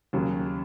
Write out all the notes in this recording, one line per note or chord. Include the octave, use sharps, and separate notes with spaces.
D#2 C#3 F#3